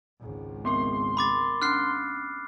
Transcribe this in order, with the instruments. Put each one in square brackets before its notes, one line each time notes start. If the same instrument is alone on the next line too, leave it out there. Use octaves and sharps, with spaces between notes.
[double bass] G#1 C#2
[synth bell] B3 C4 A#4 [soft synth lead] C6
[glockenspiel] B5 D6 A6
[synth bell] C#4 D4 [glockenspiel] F6 F#6 C7